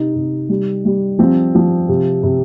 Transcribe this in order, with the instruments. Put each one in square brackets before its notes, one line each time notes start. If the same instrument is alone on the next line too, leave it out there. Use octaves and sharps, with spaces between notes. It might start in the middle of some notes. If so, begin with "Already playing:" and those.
Already playing: [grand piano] C3 D#4
C3
G3
G3
F3 C4
F3
C3
C3